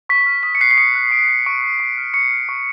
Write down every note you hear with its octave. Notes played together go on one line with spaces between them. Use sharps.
C#6 B6
F6
D#6 B6
C#7
F#6 C7
C7
D#6 C#7
F#6
C#6 D7
F#6
C#6 D7
F#6
C#6
F6
C#6 C#7
F6
C#6